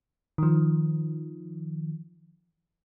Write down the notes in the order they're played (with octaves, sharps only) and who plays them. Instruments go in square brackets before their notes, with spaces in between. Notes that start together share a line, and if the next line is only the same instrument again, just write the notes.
[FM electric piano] D#3 F3